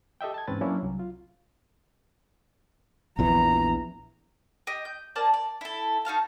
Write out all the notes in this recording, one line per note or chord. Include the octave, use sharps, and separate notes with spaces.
G4 A4 D#5 E5 G5
A5 G#6
E2 G#2 C4 C#4 B4 A6
F#3 A#3 C#4 D4 E4
C2 F#3
F4
A#1 E2 E3 A#5
G4 D#5
G6
A#3 C4 D5 A5
D5
E4 A4
D#4 F#4 F5 A5